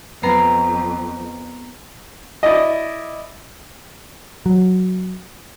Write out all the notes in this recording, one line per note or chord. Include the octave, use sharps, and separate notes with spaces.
F2 B3 A#5 C7
E4 D5 D#5
F#3